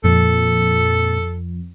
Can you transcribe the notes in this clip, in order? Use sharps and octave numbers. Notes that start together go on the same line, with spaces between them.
F2 A#2 A4